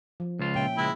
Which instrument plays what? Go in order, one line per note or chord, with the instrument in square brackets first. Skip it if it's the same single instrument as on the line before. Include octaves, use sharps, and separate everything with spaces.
[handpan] F3
[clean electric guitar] C#2 F4
[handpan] A#2 C#4 E5 [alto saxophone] G5
[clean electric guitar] C#2 [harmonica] G#3 E4